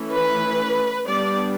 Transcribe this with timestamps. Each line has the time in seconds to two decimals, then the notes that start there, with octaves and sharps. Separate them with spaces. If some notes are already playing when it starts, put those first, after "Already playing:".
Already playing: E3 A3 C#4
0.12 B4
1.07 G3 B3 D4 D5